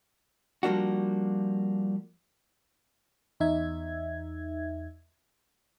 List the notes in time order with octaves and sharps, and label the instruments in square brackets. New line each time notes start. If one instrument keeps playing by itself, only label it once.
[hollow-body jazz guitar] F3 G3 A#3 D4 F#4
[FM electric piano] E2 D#4 E5 G#6